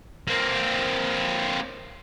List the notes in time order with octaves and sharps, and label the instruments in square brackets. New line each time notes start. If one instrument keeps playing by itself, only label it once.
[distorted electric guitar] A#3 C4